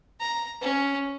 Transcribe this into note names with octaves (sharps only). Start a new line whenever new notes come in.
A#5
C#4